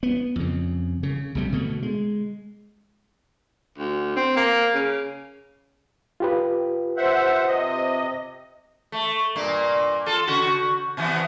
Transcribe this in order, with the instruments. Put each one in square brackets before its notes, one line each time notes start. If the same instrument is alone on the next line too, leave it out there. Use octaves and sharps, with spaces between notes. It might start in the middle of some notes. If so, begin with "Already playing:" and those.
[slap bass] B3
F2 C#3
C#3
B1 C3 G3
B2 D3 A3
G#3
[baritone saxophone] D2
C4
A#3
C#3
[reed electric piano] F4 G4 B4
[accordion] C5 E5 F#5
C3 D#5
[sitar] A3
G2 A#2 A#3
F4 A4
C#3 F#4
B2 E3 B3